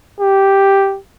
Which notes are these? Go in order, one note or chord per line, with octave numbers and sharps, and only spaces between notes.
G4